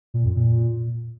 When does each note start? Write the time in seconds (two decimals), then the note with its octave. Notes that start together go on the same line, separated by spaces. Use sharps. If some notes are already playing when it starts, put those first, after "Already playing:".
0.14 A#2
0.25 F2
0.36 A#2